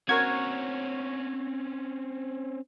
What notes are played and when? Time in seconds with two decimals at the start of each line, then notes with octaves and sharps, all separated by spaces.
0.09 C4 C#4 F#4 A#4 C#5 G#6